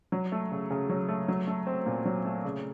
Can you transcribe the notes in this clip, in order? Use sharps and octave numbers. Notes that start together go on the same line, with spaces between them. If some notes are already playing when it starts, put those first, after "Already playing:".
F#3
A3
C#3
C#3
F#3
A3
F#3
A3
C4
A#2
F#3
A3
C#3